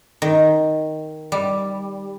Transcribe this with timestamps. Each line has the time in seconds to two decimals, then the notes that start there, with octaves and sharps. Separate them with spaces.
0.22 D#3
1.32 G3